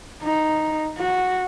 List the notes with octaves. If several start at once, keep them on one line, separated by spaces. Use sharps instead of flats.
D#4
F#4